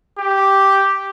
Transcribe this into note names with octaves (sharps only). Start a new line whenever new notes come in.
G4